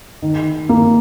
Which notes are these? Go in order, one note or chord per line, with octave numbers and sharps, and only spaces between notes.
D#3
A#3